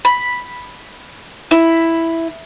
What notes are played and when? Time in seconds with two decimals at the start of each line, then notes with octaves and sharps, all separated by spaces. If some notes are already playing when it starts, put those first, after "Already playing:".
0.05 B5
1.51 E4